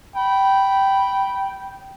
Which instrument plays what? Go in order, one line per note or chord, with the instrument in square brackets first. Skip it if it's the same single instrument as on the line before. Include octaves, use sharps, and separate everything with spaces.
[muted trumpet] G5 [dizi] B5